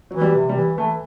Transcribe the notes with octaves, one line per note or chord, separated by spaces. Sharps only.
E3 F#3
G3
C3
G3
E3
E3 A3